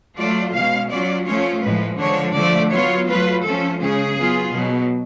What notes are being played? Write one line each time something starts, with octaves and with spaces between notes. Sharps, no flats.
F#3 A3 F4 D5
B2 G#3 C#4 F5
F#3 C#4 F4 D5
F3 A3 C#4 F4 C#5
A2 F3 G#3 B4
D3 F3 G#3 D4 C#5
D3 F3 A3 D5
F#3 B3 F4 C#5
F#3 A3 F4 B4
F3 A3 C#4 F4 A4
C#3 G#3 C#4 G#4
F#3 B3 F4
B2 F#3 B3